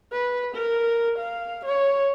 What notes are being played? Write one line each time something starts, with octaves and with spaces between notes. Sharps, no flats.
B4
A#4
F5
C#5